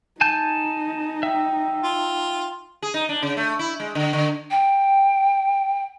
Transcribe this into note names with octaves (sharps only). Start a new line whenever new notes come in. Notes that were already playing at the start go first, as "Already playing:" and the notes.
D#4 G#5 A5 G6
E5 G5
F4
G#4
D#4
D4
C#3
A3
E4
G#3
D3
D3
G5